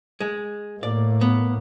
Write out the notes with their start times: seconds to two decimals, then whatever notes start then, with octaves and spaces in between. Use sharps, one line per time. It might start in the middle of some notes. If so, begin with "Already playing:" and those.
0.20 G#3
0.83 A2 A#3 D5
1.21 B3